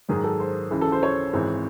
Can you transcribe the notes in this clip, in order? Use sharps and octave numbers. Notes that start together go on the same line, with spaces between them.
G#2 D#3 F#3 G#4
A4
C5
C#2 C#3 E3
A4
C5
C#5
G#1 G#2 E3 C4